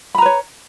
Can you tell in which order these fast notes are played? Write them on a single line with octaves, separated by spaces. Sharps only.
B5 A#5 B4 C#5